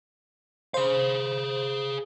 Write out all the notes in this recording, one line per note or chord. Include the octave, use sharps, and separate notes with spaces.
G#4 C5 F5